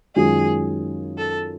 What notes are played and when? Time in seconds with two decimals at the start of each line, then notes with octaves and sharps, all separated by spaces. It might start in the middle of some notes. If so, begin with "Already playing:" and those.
0.16 F#2 D#3 G#3 C#4 F4 G#4
1.18 A4